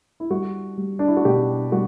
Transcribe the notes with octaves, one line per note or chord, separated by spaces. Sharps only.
E4
G3 F#4
G3
D4
E4
F#4
B2 G4
G3 F#4